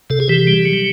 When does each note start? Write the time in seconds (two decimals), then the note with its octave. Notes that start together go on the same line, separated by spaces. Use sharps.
0.10 C3 A4
0.20 G#4
0.29 E3 G4
0.47 G3
0.65 F#3